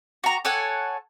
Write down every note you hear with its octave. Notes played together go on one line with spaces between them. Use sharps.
F#4 A#5
A4 C#5 F#5 G#5